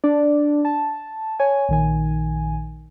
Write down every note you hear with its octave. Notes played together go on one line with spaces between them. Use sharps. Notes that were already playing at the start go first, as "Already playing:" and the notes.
D4 D5
A5
C#5 G#5
A#1 D#3 G#5